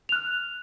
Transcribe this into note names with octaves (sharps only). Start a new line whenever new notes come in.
F6 F#6 F7